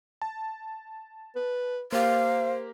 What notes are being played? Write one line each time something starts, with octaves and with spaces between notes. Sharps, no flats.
A5
B4
A#3 G4 C5 F5